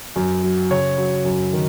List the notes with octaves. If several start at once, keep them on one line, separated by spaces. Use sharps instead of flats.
F#2
F#3
C#3 C#5
F#3
F#2
D#3